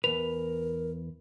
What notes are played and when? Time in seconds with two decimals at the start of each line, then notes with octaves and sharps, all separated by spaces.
0.04 E2 A#4 B4 F7